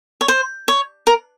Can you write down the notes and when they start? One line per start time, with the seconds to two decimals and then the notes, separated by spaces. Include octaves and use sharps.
0.21 C#5
0.28 C5
0.68 C#5
1.07 A#4